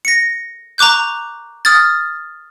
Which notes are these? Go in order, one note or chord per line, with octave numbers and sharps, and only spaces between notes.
A#6 C#7
A#5 C#6 D6 F#6 G6
D#6 F6 G#6 A6